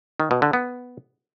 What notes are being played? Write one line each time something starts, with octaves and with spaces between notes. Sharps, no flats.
D#3
B2
D3
B3